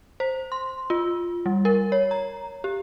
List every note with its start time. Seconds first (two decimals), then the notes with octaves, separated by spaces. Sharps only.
0.20 C5
0.52 C6
0.90 F4
1.46 G3
1.65 A#4
1.92 C#5
2.11 A#5
2.64 G4